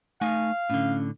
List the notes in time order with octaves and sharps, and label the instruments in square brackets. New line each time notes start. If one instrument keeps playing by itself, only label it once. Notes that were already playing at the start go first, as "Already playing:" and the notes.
[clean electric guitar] A3 D#4 G#5 [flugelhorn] F5
[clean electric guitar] A2 D3 [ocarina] C#4